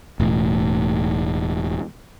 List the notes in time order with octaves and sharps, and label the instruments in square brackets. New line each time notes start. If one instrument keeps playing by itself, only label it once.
[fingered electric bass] E1 A2